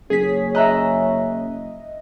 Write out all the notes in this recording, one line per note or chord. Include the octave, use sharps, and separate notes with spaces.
F#1 C#4 G#4 B6
D#5 E5 A#5 F#6